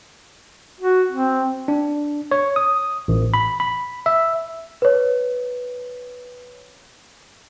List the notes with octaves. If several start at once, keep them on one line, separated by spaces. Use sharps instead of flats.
F#4
C4
D4
C#5
D#6
A1
B5
B5
E5
B4 C#5